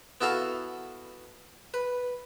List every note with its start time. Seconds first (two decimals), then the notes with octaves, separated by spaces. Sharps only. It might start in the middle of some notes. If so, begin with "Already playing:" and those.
0.21 B3 E4 F#4 A4 F5
1.74 B4